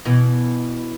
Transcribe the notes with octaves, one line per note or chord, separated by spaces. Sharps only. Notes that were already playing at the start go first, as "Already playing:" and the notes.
B2 E3